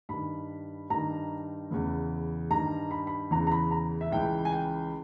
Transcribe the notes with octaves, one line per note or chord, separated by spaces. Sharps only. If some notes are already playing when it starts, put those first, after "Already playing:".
G2 D#3 B5
G2 D#3 A#5
E2 C#3 E3
G2 D#3 A#5
B5
B5
E2 C#3 E3 A#5
A#5
B5
A#5
E5
C#2 C#3 E3 G5
G#5
G5